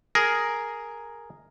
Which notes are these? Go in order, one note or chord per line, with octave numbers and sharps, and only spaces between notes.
G#4 A#4 A#5